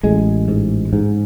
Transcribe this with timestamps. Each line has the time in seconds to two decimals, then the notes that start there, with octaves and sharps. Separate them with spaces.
0.03 A1 G#3
0.48 G#2
0.93 G#2